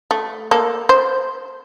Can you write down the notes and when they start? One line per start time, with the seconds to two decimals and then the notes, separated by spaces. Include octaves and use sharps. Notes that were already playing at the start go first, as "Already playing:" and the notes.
0.11 A3
0.51 A#3 A4
0.89 C5